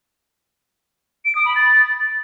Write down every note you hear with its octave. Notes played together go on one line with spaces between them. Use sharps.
D7
D#6
B5
A6